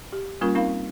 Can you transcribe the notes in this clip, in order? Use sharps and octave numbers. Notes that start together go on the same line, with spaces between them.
G4
G3 A#3 C#4 F4 A#4 C#6
C4 D#4 A#4 F5 B5